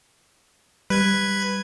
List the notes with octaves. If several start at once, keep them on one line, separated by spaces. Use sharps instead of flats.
G3 B4 G#6